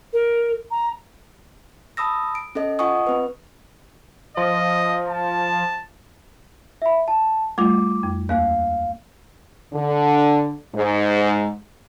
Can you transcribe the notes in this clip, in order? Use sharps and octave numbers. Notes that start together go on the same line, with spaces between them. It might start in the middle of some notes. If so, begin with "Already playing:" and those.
A#4
A#5
A5 B5 D#6 E6 A#6
D7
C#4 A4 D#5
F4 D#5 F#5 G#5 C#6 D#6
C4 B4
F3 D#5
A5
E5 B5
A5
G3 A3 F4 D6
F2
D#2 A#3 F5 F#6
D3
G#2